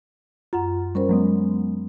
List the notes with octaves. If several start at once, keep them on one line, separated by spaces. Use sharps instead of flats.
F#2 F4 F#5 A#5
G3 C#4 A#4 C5
F#3 G#3 B3